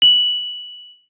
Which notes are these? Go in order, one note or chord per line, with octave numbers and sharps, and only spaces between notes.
F#7